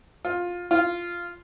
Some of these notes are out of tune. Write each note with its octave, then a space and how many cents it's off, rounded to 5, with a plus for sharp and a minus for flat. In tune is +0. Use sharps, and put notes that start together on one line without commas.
F4 +15
F4 -5